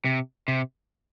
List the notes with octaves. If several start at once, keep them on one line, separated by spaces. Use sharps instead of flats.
C3
C3